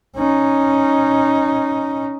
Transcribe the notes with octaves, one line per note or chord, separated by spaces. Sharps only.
C#4 D#4